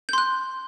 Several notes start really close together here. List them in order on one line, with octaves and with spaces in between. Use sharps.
G6 C6 F#6